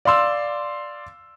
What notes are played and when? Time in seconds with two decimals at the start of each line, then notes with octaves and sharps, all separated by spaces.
0.05 D5 F5 C6 E6